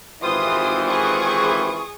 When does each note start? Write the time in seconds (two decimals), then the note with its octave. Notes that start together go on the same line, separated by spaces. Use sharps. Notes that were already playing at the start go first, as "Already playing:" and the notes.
0.23 G#1 E3 F4 G4 C5 C6 D#6
0.87 G#4 C#6 D#6